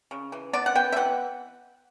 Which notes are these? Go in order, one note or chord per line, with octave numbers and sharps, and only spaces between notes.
C#3
E3
B3 D5
F#5
B3 G5
E5
E3 F#5